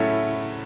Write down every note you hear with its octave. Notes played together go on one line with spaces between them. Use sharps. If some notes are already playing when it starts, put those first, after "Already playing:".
Already playing: A2 F#3 A3 C#4 E4